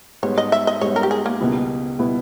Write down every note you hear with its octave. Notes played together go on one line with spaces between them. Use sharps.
G#2 G3 B3 C#5
D#5
E5
D#5
G#2 G3 B3 C#5
A#4
G4
G#4
A#3
C#2 B2 G3 B3 E4
B2 G3 B3 E4